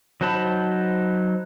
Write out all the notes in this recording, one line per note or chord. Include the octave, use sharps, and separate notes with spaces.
F#3 D#4 C5 A5 B5